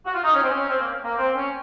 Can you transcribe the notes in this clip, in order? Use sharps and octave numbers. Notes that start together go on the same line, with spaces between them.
F#4
F4
D#4
C#4
C4
C#4
C4
A#3
A#3
C4
C#4